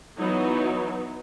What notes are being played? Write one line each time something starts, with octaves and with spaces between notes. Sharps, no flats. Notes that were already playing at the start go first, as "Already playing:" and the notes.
E3 F#3 B3 D#4